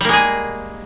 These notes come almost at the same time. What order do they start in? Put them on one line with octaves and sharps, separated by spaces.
G3 A#3 G#3 G#4